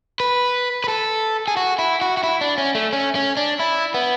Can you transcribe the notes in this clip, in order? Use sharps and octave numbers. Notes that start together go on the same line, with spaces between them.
B4
B4
A4
G#4
F#4
E4
F#4
F#4
E4
D4
C#4
A3
C#4
C#4
D4
E4
B3